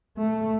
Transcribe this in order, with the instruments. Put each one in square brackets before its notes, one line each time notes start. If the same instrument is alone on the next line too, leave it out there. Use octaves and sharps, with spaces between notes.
[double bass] A3